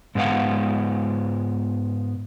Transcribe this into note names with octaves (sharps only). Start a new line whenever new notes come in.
G#2 G#3 B3 F5 F#5